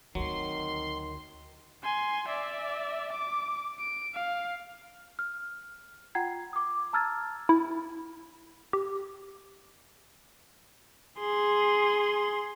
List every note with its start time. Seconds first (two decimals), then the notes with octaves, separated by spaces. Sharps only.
0.15 D2 D#3 F#3 C4 C6
1.83 G#5 C6
2.28 D5 E5
3.12 D6
3.80 D7
4.14 F5
5.19 F6
6.15 F4 F#5 G5 A#5 G#6 C7
6.53 D6 D#6
6.93 A5 A#5 E6 F6 G#6 A6
7.49 E4
8.73 G4
11.19 G#4 C6